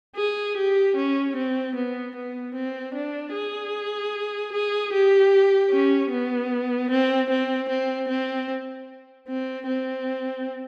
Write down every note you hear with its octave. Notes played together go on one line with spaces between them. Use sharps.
G#4
G4
C#4
C4
B3
B3
C4
D4
G#4
G#4
G4
C#4
B3
C4
C4
C4
C4
C4
C4